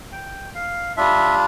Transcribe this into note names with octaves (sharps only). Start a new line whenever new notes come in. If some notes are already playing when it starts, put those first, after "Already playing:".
G5
F5
G3 D4 F4 E5